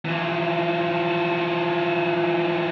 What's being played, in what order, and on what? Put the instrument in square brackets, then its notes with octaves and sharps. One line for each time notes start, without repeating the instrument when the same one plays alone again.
[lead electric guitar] E3 F3